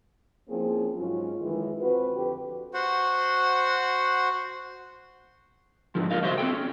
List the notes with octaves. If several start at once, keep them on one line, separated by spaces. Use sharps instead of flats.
F3 A#3 C4 C#4 E4 G#4
G#2 F#3 C#4 F4
F#2 D#3 E3 G#3 G#4
C4 F4 F#4 B4
F2 D3 G4 B4
F#4 C5 F#5
G#2 D3 F3
F4 A#4 D#5 F5
C2 F#4 C5 D#5 E5 C6
C4 D#4 A4 G5
C#4